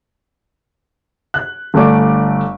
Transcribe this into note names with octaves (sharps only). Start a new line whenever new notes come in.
F#6
G1 A3 D5 D6